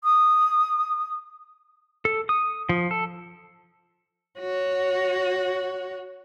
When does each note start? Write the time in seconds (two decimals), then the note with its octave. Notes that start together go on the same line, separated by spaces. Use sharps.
0.04 D#6
2.05 A4
2.29 D#6
2.69 F3
2.91 A4
4.39 F#4 C#5